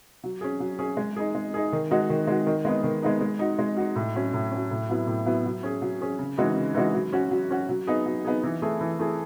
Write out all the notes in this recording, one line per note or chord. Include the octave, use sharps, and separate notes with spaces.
F#3
C#4 G#4
F#3
C#4 G#4
G#3
D#4 G#4
G#3
D#4 G#4
D#3
G#3 D#4 F#4
D#3
G#3 D#4 F#4
D#3
G#3 B3 D#4
D#3
G#3 B3 D#4
G#3
D#4 F#4
G#3
D#4 F#4
A2
F#3 C#4
A2
F#3 C#4
A2
F#3 B3 E4
A2
F#3 B3 E4
F#3
C#4 G#4
F#3
C#4 G#4
C#3
E3 G#3 D#4 F#4
C#3
E3 G#3 D#4 F#4
F#3
C#4 F#4
F#3
C#4 F#4
F#3
B3 D#4 G#4
F#3
B3 D#4 G#4
E3
A3 E4 G#4
E3
A3 E4 G#4